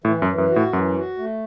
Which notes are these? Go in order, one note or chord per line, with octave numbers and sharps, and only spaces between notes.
A2 E3
F#2
E3
F#2
F#4
A2
F#2 E3
F#4
A3